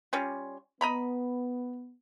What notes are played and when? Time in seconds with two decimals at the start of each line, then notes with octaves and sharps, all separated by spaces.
0.13 G3 C#4 F4
0.81 B3 D#5 A#5 B5